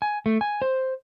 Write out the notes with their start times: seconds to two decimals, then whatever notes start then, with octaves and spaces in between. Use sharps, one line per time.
0.02 G#5
0.26 A3
0.41 G#5
0.62 C5